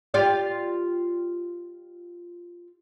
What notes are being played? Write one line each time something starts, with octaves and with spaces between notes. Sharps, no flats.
F4 G4 D5